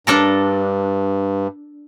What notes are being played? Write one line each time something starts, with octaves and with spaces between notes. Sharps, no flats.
G2 D4 A4 A#4